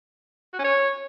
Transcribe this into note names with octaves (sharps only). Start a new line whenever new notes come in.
F#4
C#4
C#5